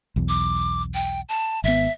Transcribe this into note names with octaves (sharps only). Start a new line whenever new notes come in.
B1 E2
D6
G5
A5
G#1 B3 E5